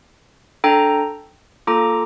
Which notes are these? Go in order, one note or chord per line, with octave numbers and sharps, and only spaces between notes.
D4 A4 G5 A#5
A#3 F4 A4 A#5 D6